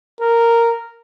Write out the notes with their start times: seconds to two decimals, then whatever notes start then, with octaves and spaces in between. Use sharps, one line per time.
0.21 A#4